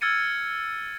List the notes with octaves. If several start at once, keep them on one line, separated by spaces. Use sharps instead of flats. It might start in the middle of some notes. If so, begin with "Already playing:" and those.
E6 F6 G#6 A6 C#7 D#7